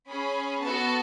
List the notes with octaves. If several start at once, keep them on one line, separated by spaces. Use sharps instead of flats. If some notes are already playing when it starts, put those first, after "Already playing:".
C#4 G#4 B5
B3 F#4 A4 A5